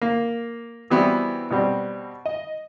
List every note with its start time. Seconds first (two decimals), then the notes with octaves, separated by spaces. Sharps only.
0.02 A#3
0.90 E3 G3 B3 C4 E4 F#4
1.51 B2 G3 C4
2.25 D#5